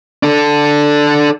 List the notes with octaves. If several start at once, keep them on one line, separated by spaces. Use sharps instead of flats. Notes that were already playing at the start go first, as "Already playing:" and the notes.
D4 A4